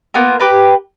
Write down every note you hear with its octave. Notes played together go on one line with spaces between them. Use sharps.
A#3 B3 F4 A#4
G4 B4 A#5